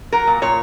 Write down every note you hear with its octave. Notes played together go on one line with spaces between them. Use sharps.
F#3 A#4
A#2
A#2 C#5